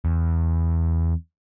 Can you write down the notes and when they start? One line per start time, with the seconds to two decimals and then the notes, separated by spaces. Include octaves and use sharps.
0.05 E2